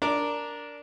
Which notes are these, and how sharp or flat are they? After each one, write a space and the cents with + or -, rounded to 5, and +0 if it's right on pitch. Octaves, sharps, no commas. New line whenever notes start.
D4 -10 A#4 +0 D6 +0